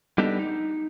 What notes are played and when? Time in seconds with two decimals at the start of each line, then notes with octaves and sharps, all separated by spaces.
0.18 G3 B3 D4 D#4 G4 A4
0.39 D#4